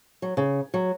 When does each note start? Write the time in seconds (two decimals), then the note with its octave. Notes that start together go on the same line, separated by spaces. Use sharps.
0.22 F#3
0.37 C#3
0.74 F#3